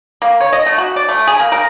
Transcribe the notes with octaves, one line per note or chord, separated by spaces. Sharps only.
A#3
C#5
D#5
A3
F#4
D5
A3
G#4
A#3
A#4